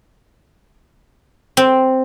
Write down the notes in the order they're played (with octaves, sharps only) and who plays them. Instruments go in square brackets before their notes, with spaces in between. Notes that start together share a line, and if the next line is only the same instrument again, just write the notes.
[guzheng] C4